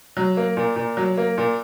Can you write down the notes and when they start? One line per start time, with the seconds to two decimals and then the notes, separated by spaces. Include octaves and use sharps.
0.17 F#3
0.37 A#3
0.57 A#2
0.76 A#2
0.97 F#3
1.17 A#3
1.38 A#2